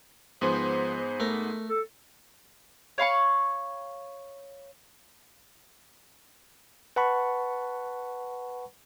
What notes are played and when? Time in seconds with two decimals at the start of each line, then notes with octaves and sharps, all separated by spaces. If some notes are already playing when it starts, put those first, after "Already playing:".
0.41 G#2 F3 B3 G#4 C5
1.20 A3 A#4
1.69 A4
2.98 C#5 F5 B5 C#6
6.96 B4 F#5 A5 B5 C#6